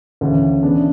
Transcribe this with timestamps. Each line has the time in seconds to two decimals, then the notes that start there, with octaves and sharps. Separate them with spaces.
0.21 D2 C#3 E3
0.63 C#3 E3 B3 D4